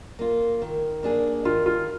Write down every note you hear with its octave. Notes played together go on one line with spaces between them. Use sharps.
A#3 F4
D#3
A#3 D4 G#4
D#3 F4
F4